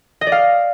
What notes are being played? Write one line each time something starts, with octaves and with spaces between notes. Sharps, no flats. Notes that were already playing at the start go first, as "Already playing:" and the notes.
D#5
D5
F5